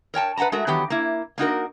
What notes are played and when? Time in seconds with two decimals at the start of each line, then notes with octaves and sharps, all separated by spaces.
0.14 A#4 C#5 G5 A5
0.37 B4 F#5 G5 A5 A#5
0.52 G#3 A3 F#4 A#4
0.67 D#3 E3 F#3 B3 G4
0.90 A#3 E4
1.38 A#3 D#4 F#4 A#4